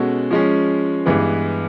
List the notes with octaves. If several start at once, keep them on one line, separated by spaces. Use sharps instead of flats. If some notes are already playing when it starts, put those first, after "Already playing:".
Already playing: B2 G#3 C#4 F#4 A4
F3 G#3 C#4
G2 E3 G#3 B3